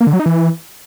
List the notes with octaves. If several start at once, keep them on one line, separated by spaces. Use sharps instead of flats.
A#3
D3
F#3
D#4
E3